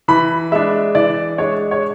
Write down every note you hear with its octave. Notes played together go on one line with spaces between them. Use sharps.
E3 B5
G#3 D4 E5
E3 D5
G#3 D4 C#5
C#5